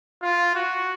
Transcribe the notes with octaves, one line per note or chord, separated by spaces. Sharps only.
F4
F#4